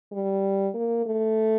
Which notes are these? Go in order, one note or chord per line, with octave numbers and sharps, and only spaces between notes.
G3
A#3
A3